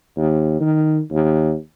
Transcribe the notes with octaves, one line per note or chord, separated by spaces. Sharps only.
D#2
D#3
D#2